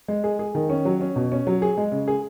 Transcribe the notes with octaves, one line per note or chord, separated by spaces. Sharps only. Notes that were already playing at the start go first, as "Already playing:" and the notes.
G#3
G#4
G#4
D#3
C#4
F#3
C#4
B2
C#4
F#3
G#4
G#3
C#3
G#4